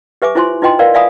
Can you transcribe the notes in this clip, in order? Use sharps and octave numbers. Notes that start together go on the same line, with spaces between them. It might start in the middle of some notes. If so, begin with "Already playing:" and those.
G4 B4 E5 G#5 D6
E4 F4 C5 G#5 C6
D#4 F4 B4 D#5 G5 C6
A#4 B4 D5 F5
D5 E5 F5 G#5 B5 D#6